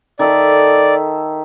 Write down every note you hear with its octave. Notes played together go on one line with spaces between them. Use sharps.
D#3 A4 D5 E5